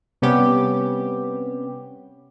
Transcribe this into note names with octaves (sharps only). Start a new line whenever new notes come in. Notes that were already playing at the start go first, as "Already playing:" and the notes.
C3 G3 B3 C#4 G4